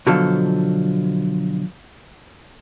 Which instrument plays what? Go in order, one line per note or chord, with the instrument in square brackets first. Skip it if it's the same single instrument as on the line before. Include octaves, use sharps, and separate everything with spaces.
[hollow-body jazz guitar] B2 D3 F3 F#3 A4